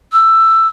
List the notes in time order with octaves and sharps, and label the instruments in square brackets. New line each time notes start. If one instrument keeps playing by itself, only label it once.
[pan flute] E6